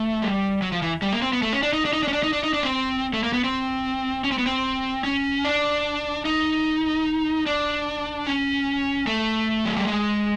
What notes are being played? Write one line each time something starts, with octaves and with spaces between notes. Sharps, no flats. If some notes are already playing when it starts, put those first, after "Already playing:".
Already playing: A3
G3
F#3
F3
E3
G3
A#3
C4
B3
A3
C#4
D4
D#4
D4
D#4
D4
C#4
D4
D#4
D4
D#4
D4
C4
A3
A#3
B3
C4
C#4
C4
B3
C4
C#4
D4
D#4
D4
C#4
A3
F#3
G3
G#3